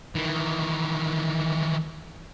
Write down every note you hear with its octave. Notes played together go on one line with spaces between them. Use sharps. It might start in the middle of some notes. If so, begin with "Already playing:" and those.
D#3 E3